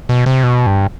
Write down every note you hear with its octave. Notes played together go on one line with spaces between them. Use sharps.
B2
C3
B2
G2